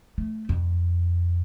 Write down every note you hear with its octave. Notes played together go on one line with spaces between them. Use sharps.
A3
F2